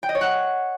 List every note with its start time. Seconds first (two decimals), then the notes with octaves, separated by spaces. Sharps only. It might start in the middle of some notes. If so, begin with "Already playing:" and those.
0.03 G5
0.09 D#5
0.15 C#5
0.21 F#5